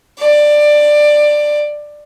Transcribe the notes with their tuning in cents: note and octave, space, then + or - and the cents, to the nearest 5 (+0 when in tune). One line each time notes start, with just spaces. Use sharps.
D5 +15